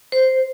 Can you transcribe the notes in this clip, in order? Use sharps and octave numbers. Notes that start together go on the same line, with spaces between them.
C5